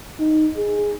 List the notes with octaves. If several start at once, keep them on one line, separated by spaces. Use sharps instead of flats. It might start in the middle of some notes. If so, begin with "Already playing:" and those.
D#4
G#4